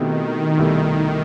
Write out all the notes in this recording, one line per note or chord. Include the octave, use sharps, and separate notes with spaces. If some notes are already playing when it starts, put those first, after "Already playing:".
Already playing: B2 D#3 A3 C4 E4 G4
D#3
C2 B2 A3 E4 G4